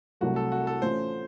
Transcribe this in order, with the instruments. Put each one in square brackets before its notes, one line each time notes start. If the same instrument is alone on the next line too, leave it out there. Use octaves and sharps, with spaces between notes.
[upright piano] C2 C3 F#3 A3 [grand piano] F#4
[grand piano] A4
F#4
A4
[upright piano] A1 A2 A3 C#4 F4 [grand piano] C5